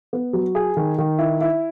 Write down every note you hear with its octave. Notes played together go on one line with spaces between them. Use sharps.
B3
F#3
G#4
D#3
D#3
E4
E4